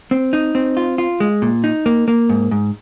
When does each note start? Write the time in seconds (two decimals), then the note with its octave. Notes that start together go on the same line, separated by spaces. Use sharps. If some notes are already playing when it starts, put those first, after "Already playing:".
0.11 C4
0.33 D#4
0.55 C4
0.77 F4
0.98 F4
1.20 G#3
1.42 A#2
1.64 D#4
1.86 A#3
2.08 A#3
2.29 G#2
2.51 G#2